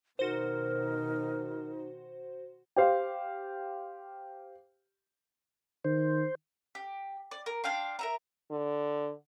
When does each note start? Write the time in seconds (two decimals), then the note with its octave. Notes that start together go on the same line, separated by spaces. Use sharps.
0.19 B2 D#3 D#4 F#4 A#4 C5
2.76 G4 C5 F5
5.84 D#3 C5
6.75 G4
7.31 D5
7.46 A#4
7.64 D4 F5 G5 C6
7.99 A#4 E5 A#5
8.51 D3